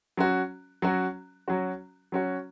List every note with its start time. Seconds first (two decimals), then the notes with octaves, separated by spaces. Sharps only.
0.17 F#3 C#4 F#4
0.82 F#3 C#4 F#4
1.48 F#3 C#4 F#4
2.12 F#3 C#4 F#4